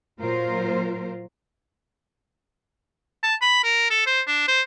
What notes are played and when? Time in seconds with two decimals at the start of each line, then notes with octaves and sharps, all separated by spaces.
0.20 A#2 F#3 F4 A#4 C5
3.23 A5
3.42 B5
3.64 A#4
3.90 A4
4.07 C5
4.27 D4
4.48 C5